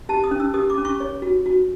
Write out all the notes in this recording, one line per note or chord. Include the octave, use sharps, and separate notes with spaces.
G4 A5
D#6
C#4
E6
G4 D#6
D6
C#4
C#6
C#5
F#4
F#4